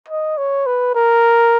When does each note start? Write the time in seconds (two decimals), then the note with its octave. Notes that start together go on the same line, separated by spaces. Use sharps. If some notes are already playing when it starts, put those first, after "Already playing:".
0.08 D#5
0.38 C#5
0.66 B4
0.95 A#4